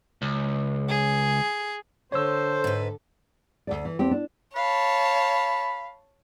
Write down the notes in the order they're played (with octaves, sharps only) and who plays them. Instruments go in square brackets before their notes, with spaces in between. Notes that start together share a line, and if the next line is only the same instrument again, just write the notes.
[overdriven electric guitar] C#2
[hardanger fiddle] G#4
[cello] D3 A4 [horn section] C5 [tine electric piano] C#5 E6
[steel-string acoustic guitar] G#2 B4
[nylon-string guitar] D2 G2 D5
E3
E2 C4 G4
D4
[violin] C#5 A5 [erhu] F5 [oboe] B5